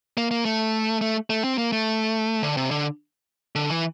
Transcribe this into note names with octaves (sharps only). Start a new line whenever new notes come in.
A#3
A#3
A3
A3
A3
C4
A#3
A3
D3
C3
D3
D3
E3